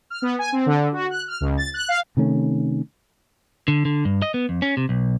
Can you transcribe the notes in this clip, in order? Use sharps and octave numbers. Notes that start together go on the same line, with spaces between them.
F6
B3
G#5
C4
D3
F#4
F#6
F6
C#2
A6
F#6
F5
C3 D#3 A3 C#4
D3
D3
G2
D#5
B3
F2
C#4
C3
B1